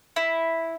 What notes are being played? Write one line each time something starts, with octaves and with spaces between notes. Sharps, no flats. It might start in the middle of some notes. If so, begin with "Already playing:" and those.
E4